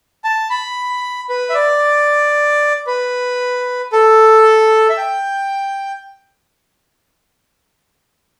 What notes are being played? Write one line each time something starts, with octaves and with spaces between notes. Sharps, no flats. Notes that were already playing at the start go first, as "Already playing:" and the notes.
A5
B5
B4
E5
D5
B4
A4
E5
G5